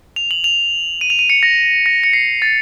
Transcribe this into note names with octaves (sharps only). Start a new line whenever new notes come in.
F7
F#7
F7
D#7
F7
D#7
C#7
A#6
A#6
C#7
C7
A6